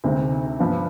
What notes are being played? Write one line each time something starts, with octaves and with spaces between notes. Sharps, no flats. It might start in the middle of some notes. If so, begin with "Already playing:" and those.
D2 C3 D#3 G#3 C4
G2 F3 B3